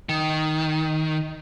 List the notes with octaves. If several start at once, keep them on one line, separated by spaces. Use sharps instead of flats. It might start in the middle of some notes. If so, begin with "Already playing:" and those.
D#3